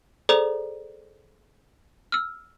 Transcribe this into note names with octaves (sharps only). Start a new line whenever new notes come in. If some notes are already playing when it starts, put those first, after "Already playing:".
G#4 A4 C5 D5 A#5
E6 F6